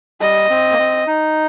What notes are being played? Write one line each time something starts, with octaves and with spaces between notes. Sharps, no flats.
G3 D#5
C4
A#3
C4
D#4